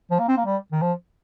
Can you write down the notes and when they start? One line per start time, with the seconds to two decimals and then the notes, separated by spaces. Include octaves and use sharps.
0.11 F3
0.19 A#3
0.28 C4
0.37 A#3
0.46 G3
0.72 D#3
0.82 F3